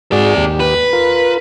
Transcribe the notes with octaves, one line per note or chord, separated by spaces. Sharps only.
G#2 C4 F#4 G#4 D5
D#2 G4
B4
F4 A#4